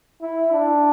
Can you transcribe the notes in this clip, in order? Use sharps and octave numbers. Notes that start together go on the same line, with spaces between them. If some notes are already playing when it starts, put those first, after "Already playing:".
E4
D4